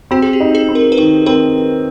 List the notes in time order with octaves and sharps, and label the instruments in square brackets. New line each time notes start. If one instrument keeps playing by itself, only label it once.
[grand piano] C4 [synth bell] F#4
[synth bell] G#4
G4
[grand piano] D#4
[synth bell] G#4
[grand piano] C4
[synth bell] A#4
B4
[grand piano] D#3 [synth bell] A#4
[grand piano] C4 [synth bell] A#4